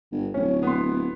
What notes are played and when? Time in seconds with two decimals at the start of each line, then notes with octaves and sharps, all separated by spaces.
0.12 G1
0.34 D1 C#4
0.63 B3 C6